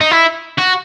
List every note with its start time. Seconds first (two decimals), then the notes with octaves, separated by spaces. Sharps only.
0.01 D#4
0.11 E4
0.58 F#4